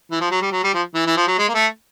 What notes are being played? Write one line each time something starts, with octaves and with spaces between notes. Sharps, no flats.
E3
F3
F#3
G3
F#3
G3
F3
E3
E3
F3
F#3
G#3
A#3
A3